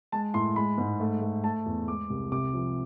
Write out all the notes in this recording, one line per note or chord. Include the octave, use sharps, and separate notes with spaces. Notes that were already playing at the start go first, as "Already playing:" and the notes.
G#3 A5
A2 C6
G#3 B5
G#2
A3
A3
A3 A5
E2
G#3 D6
C2
C3 D6
F3